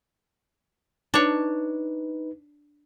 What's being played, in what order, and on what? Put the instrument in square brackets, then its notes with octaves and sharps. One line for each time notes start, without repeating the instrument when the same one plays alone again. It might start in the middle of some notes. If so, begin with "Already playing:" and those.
[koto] D4 C#5 [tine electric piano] D#4 B4